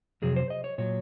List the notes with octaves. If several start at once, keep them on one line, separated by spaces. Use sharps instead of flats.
F2 C3 F#3 G#4
C5
D#5
C#5
A#2 F#3 C#5